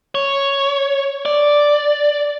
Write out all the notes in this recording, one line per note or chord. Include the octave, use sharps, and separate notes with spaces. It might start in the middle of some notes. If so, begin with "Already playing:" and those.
C#5
D5